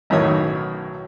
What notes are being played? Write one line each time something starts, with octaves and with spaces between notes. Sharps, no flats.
B1 F#2 A2 D#3 C#5 D#6